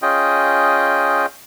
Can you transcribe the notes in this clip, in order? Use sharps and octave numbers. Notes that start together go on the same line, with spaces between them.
C#4 F4 G#4 D#5 G5